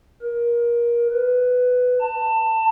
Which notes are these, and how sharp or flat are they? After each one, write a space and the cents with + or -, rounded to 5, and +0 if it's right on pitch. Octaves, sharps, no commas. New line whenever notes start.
A#4 +25
B4 +10
A5 +20